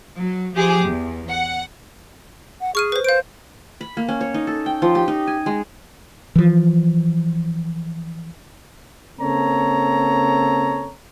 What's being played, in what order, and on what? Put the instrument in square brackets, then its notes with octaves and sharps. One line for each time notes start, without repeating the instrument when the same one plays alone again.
[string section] F#3
F3 G4 G#4 D6
E2
F#5
[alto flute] F#5
[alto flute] G#4 [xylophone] C#6 F6 D#7
[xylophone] B4 C5
[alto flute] C5 [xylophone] F5 D7
[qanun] B5
A#3
C#4
C#5
D#4
A4
G5
F3
G4
D#4
G#5
G#3
[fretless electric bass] E3 F3
[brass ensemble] C#3 A#3 C4 A4 C#5 A#5